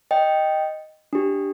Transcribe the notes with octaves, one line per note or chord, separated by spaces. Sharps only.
D#5 G5
D4 G4